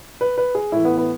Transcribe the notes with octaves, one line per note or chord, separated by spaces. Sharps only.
B4
B4
G#4
A2 E3 E4
B3
B3